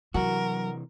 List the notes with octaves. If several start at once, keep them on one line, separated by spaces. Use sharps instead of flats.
C3 E3 F#3 F#4 A#4